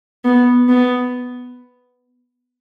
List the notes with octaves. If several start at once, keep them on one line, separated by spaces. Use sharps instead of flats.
B3
B3